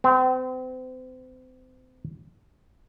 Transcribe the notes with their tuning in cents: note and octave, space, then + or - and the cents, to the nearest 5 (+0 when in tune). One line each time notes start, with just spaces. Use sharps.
C4 -35